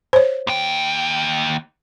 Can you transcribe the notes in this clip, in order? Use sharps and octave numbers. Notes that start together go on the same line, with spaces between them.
C5 C#5
D#2 G5